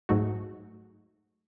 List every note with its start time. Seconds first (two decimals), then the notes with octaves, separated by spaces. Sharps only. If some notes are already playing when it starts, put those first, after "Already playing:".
0.09 G#2 F#3 A3 D#4 F#4